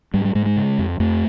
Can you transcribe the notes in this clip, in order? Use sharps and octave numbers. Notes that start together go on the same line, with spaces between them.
G#2 G3
G3
G#2 G#3
G#3
C#3
F2
F2 A3